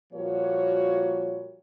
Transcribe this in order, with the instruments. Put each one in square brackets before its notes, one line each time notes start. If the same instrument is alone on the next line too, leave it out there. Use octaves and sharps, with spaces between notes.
[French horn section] A#2 F3 G3 A#3 F#4 C#5